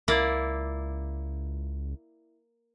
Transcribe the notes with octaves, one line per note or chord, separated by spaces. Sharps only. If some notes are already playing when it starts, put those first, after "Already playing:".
C#2 A#3 E4 D5